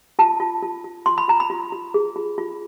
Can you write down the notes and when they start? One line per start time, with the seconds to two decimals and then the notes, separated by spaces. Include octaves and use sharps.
0.19 F4 A5
0.40 F4
0.62 F4
0.84 F4
1.06 F4 C6
1.18 B5
1.28 F4 A#5
1.40 B5
1.50 F4
1.72 F4
1.94 G#4
2.16 F4
2.38 F4